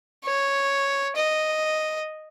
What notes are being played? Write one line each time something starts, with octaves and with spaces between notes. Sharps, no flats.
C#5
D#5